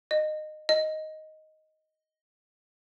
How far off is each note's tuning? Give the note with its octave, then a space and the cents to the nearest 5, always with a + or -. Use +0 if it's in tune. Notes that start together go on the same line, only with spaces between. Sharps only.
D#5 -20
D#5 +5